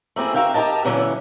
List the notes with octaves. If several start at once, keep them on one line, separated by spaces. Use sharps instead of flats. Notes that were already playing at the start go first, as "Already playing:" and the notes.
A3 A#3 C4 E4 G#4
C4 F#4 A#4 E5 F5 G5
G4 A4 A#4 D#5 A5
A#2 D3 E3 F#3 C#4 E4